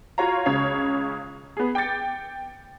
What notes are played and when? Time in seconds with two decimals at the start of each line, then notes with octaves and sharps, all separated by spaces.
0.18 F4 F#4 C#5 F5 A#5
0.46 C#2 C#3 C#5 C7
1.57 B3 G#4
1.75 G5 D6 G6 A6 C#7